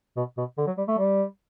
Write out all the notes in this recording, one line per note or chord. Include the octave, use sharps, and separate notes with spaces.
B2
B2
D3
F#3
G3
A3
G3